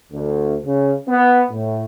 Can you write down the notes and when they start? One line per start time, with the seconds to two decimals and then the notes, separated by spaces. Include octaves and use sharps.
0.12 D2
0.65 C#3
1.08 B3
1.50 A2